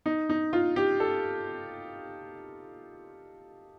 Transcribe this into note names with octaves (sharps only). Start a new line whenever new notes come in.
D#4
D#4
F4
G4
A4